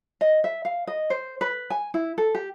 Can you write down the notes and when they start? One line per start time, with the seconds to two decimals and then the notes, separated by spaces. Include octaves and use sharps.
0.21 D#5
0.44 E5
0.65 F5
0.87 D#5
1.10 C5
1.41 B4
1.70 G#5
1.94 E4
2.18 A4
2.35 G4